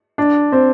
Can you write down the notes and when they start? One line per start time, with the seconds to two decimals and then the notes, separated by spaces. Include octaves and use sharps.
0.18 D4
0.52 C4